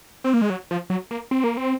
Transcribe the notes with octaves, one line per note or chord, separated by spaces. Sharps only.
C4
A#3
G#3
F#3
F3
F#3
A#3
C4
A#3
C4